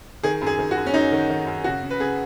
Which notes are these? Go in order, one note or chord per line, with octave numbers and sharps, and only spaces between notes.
D#3 G#4
F#2
G#4
D#3
F#4
F#2
C#4
F#2 D#4
D#3
D#3
F#2
C#3 F#4
C#3
B4
C#3 G#4